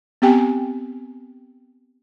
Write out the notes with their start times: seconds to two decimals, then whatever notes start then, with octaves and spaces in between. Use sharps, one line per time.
0.22 B3 C4 G4 G5 G#5